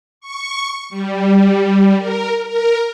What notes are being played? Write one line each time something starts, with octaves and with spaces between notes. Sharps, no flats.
C#6
G3
A#4
A#4